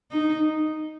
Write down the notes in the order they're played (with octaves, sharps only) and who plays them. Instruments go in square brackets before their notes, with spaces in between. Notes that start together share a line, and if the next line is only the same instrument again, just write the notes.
[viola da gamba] D#4